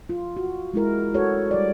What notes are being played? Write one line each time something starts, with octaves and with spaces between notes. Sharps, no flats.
F4
F#4
G#3 E4 A#4
F#4 A4 B4 C#5
G3 D5